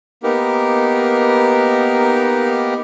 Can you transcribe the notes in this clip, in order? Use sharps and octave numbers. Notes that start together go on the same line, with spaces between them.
A#3 B3 D#4 G4 A#4